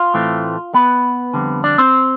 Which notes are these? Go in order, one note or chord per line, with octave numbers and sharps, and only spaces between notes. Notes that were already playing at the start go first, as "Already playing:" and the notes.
Already playing: F4
A2 E3 A3 C4
B3 B4
F2 D3 G3 C4
D4 D5
C4 C5